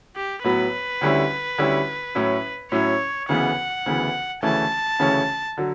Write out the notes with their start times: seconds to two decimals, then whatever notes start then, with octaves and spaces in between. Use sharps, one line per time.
0.16 G4
0.44 A2 F#3 B3 B4
1.01 D2 D3 G3 C#4 E4
1.58 D2 D3 G3 C#4 E4
2.15 A2 F#3 C#4 E4
2.71 A2 F#3 C#4 E4 C#5
3.29 D2 C#3 E3 B3 F#5
3.86 D2 C#3 E3 B3
4.42 D2 C#3 E3 A3 C#4 A5
4.99 D2 C#3 E3 A3 C#4
5.58 D3 F#3